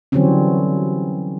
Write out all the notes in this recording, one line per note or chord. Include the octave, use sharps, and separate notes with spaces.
D3 E3 F#3 G3 C4 C#4